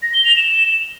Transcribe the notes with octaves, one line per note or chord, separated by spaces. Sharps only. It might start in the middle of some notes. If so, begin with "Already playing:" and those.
A#6
G7
F7
E7